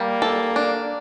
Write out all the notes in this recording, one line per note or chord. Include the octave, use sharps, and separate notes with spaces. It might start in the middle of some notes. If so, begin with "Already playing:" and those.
Already playing: G3 A#3
A4
D4